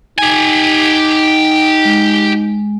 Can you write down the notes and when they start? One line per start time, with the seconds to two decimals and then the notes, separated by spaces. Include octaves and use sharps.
0.19 D#4 G4 G#5
1.85 G#3